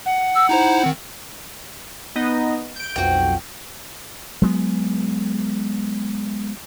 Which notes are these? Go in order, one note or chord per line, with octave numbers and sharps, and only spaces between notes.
F#5
E6
D#4 E4 C5 A#5
D#3 C4
B3 D#4 D#5
G6 D7
B1 F2 F#4 G5
F#3 G#3 B3